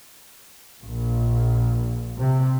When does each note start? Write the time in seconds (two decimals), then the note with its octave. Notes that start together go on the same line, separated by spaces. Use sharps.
0.83 A#1
2.18 C3